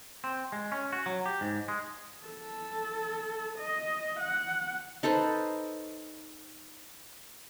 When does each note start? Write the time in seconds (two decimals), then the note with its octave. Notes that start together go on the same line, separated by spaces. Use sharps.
0.24 C4
0.52 G#3
0.72 C#4
0.93 F#4
1.06 F#3
1.26 G4
1.41 G#2
1.68 G#3
2.26 A4
3.58 D#5
4.20 F#5
5.03 D#4 A4 B4 C5